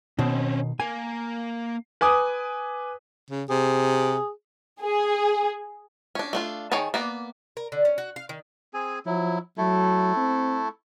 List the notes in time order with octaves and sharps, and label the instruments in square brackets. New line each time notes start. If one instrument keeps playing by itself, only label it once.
[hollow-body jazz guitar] B2 D#3 [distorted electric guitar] C4 C#4
[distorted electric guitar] A#3 [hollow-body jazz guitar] G#5
[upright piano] B4 G#5 D6 D#6
[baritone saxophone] C#3
[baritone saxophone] C3 [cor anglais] G#4
[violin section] G#4
[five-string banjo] C#4 D4
A3 D4 F4
D#3 G#4 C#5 G5 A5
A#3 B3 D5
[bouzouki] A#4
D3
C#4
F#4
F5
D#3
[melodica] C4 G#4 G#5
[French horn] F3 [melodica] F#3 E4
[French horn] F#3 [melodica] A3 E4 A4
[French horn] C4